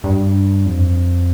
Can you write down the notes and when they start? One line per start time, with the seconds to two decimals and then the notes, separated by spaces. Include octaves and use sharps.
0.04 G2
0.66 F2